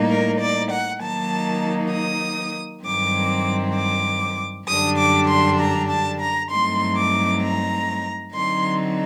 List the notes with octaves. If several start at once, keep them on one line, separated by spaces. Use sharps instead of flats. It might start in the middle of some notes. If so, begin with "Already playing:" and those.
Already playing: A2 G3 A#3 D#4
A#4
D5
F#5
D#3 F#3 A#3 D#4 A5
D#6
G2 D#3 F#3 C4 D6
D6
F#2 D3 G3 D4 D#6
D6
C6
A#5
A5
A#5
G2 F#3 A3 C4 D#4 C6
D6
A#5
D3 F#3 C4 D#4 C6